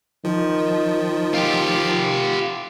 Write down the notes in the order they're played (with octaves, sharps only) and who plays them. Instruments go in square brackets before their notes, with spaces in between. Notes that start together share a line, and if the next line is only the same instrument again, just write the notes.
[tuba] D#3 [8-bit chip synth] F3
[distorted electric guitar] F4 G4